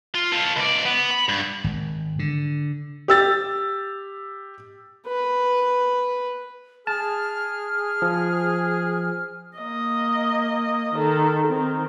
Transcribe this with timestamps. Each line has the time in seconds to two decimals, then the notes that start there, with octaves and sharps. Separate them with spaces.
0.15 F4
0.33 A4 F5
0.57 C#2 D5
0.86 B3
1.11 B5
1.29 G2
1.64 G#1
2.19 D3
3.08 G4 E6 A6
5.07 B4
6.87 G#4 A5 F6
8.02 F3
9.58 A#3 D#5
10.94 D#3 A4
11.47 D#3 C4